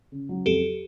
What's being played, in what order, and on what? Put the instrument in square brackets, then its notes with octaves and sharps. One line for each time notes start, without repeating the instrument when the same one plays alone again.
[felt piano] C#3
F#3
[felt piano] F2 [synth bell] G4 A4